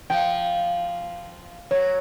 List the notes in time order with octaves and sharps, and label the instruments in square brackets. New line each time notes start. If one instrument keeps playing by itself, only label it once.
[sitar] F3 [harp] G5
[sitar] F#3 [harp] C#5